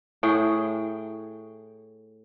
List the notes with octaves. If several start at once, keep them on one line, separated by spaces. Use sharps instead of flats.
A2 G#4 G5